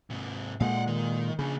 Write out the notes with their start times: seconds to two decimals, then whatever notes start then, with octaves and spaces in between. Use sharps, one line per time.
0.10 G#2 C3
0.60 A#2 G#3 F5 F#5
0.87 D#3
1.39 C#3 A#3 D4